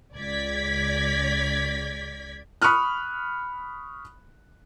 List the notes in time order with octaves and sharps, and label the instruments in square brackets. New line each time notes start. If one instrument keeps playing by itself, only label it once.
[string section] C#2 D5 G#6 B6
[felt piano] B5 C#6 D#6 F6 F#6